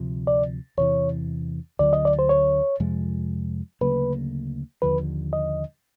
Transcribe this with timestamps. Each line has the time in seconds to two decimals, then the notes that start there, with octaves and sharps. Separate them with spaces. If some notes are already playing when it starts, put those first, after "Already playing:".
Already playing: D2 C3 F3
0.27 D5
0.77 E2 C3 E3 C#5
1.79 D2 D3 F#3 D5
1.93 D#5
2.05 D5
2.19 C5
2.29 C#5
2.80 F2 C3 F3 G#3
3.81 D2 C#3 F#3 A#3 B4
4.82 D#2 D3 F3 B4
5.33 D#5